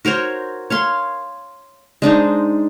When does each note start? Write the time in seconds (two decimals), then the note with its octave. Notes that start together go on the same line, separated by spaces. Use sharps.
0.05 F#4 A#4 C5 C#5
0.70 C#5 F5 C6
2.02 G#3 D4 D#4 C5